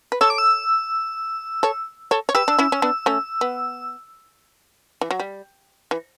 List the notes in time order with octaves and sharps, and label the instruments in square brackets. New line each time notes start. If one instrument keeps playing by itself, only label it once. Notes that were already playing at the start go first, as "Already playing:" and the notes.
[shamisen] B4
[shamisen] A4 C#5 [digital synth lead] E6
[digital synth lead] D6
E6
[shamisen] A4 C#5
A4 C#5
C#5
[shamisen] G4 B4 [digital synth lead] E6
[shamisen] D4
C#4 E4
C#4
B3 D4
A3 C#4
B3
E3
F#3
G3
E3